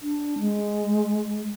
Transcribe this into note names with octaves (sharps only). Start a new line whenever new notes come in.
D4
G#3